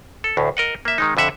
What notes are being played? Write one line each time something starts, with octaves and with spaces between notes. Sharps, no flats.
A4
D2 A2
A#4 D#5 F#5
A#3 E5
D#3 G#3 D#4
F2 D3 E5 F#5